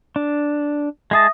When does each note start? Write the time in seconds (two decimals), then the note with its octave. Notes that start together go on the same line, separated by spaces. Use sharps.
0.16 D4
1.11 G#3 G#4 E5 A5 D#6 A#6